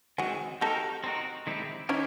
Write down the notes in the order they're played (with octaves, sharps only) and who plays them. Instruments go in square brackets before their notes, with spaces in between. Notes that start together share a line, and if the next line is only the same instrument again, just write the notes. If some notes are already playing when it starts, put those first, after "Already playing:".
[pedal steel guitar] D#3 G#3 C4 [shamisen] F#4 G#4
[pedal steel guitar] C4 D#4 F#4 A#4 [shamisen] G4 A4
[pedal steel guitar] C4 D#4 F#4 A#4
D#3 G#3 C4 E4 G4
[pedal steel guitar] D#3 E4 G4 [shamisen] C#4 D#4